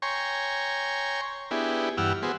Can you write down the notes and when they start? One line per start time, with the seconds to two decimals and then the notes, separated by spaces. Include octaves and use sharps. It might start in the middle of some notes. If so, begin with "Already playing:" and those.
0.02 C#5 G5 G#5 A#5 C6 C#6
1.51 B3 D4 E4 G4 G#4
1.97 G2 E3 G4 F#5 E6 F6
2.23 B3 F#4 G#4 C5